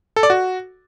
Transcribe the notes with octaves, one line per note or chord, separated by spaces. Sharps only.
A4
D5
F#4